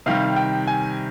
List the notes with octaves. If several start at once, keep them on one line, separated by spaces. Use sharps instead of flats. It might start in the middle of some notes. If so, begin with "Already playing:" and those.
C3 D#3 G3 F5
G5
G#5